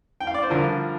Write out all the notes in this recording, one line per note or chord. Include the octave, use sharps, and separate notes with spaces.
G5
F5
D5
C5
G2 D3 F3 F4 A#4